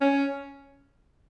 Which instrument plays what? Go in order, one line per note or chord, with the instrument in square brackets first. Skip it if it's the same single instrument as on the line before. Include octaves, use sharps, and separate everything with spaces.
[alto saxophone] C#4